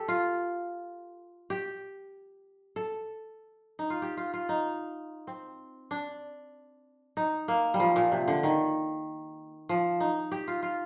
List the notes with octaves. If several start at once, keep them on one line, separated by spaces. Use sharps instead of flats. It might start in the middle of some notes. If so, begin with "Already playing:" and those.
Already playing: G4 A4
F4
G4
A4
D#4
F4
G4
F4
F4
D#4
C4
D4
D#4
A#3
G3
F3
A#2
C3
D3
D#3
F3
D#4
G4
F4
F4